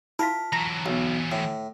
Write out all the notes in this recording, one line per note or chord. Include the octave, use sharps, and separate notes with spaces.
E4 F4 A#4 A5 B6
E3 F#3 A#5 A#6
B1
A2